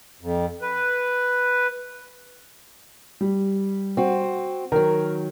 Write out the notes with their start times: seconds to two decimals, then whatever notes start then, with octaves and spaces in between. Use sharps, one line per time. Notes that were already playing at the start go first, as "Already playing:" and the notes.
0.21 F2
0.62 B4
3.21 G3
3.97 C4 F#4
4.72 D#3 F#3 A#4